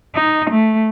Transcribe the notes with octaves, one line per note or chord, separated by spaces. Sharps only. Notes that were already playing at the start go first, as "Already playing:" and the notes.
D#4
A3